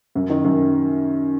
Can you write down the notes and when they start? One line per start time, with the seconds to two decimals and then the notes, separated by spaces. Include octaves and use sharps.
0.15 F#2
0.30 D#3
0.44 F#2